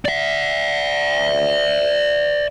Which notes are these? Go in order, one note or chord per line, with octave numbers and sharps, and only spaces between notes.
D5 E5